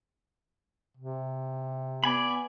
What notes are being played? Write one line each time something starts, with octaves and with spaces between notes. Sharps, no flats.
C3
B3 D5 G#5 B5